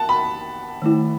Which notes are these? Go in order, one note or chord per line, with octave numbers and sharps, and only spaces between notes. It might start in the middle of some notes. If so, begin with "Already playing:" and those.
Already playing: F#5 A5
B5
D#3 A3 E4